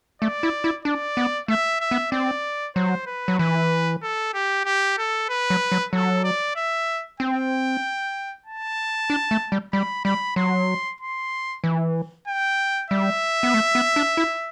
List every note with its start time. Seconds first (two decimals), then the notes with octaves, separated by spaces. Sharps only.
0.22 A3 D5
0.43 E4
0.64 E4
0.85 D4 D5
1.17 B3
1.48 A3 E5
1.80 E5
1.91 B3
2.12 C4 D5
2.76 F#3 C5
3.07 B4
3.28 F#3
3.39 E3 B4
4.03 A4
4.34 G4
4.65 G4
4.98 A4
5.29 B4
5.50 F#3
5.72 F#3
5.93 F#3 A4
6.24 D5
6.56 E5
7.20 C4 G5
8.46 A5
9.10 D4
9.31 A3
9.52 G3
9.73 G3 B5
10.05 G3 B5
10.36 F#3 C6
11.01 C6
11.64 E3
12.28 G5
12.91 G3 E5
13.43 B3
13.54 A3
13.75 B3
13.96 D4
14.17 E4